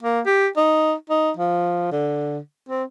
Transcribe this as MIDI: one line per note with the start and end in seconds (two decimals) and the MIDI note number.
0.03 0.21 58
0.26 0.47 67
0.57 0.93 63
1.10 1.31 63
1.37 1.90 53
1.91 2.38 50
2.69 2.83 60